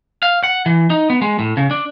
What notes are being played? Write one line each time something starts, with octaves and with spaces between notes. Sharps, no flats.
F5
F#5
E3
D#4
B3
G#3
A2
C#3
D4